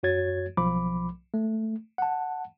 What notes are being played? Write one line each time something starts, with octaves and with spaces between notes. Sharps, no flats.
F#2 F#4 C#5 G#6 A6
B1 F3 B5 D6
A3
F#5 A5